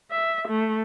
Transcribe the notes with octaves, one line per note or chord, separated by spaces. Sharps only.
E5
A3